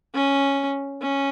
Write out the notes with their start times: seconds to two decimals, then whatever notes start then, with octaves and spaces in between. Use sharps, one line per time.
0.14 C#4
1.01 C#4